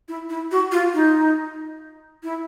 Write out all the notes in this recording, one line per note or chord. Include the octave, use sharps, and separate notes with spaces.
E4
E4
F#4
F4
D#4
E4